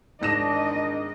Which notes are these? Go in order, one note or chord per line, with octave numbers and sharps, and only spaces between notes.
G#2 D#3 D4 D#5 A#6 E7